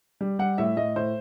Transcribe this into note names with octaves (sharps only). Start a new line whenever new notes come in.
G3
G3 F#5
A2 E5
A2 D#5
A2 C5